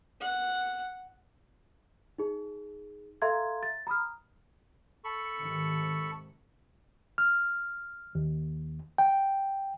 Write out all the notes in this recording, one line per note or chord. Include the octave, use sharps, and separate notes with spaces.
F#5
D#4 G#4
A4 E5 F5 A#5 C6 G#6
A6
A#5 B5 D#6 F6
A4 B5 C#6
G#2 C3 D#3
F6
D#2
G5